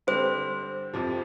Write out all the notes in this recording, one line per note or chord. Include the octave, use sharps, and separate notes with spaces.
D3 G3 C4 G4 C5
F2 C3 F3